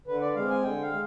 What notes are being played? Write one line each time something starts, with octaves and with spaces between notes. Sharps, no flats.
D3 B4
D5
G#3 C4 F5
G#5
D3 G5
F5
G#3